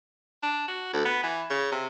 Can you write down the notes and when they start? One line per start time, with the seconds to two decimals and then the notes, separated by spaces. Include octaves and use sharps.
0.43 D4
0.68 F#4
0.93 D2
1.05 B3
1.23 E3
1.50 C#3
1.72 C3